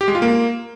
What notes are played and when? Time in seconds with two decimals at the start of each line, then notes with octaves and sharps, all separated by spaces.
0.01 G4
0.08 G#3
0.15 F4
0.22 A#3